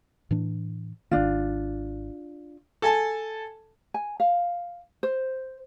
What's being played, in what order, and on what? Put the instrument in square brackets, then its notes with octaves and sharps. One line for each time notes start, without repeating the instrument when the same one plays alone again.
[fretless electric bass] A2 E3 D4
[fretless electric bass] G#1 D#3 [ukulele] D4 F4
[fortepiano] A4 G#5 A5
[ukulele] G#5
F5
C5